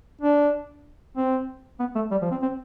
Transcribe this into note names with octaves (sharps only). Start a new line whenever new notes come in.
D4
C4
B3
A3
G3
F3
C4
C4